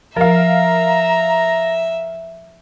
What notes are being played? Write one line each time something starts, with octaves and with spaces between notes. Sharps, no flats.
F3 A#4 E5 F5 A#5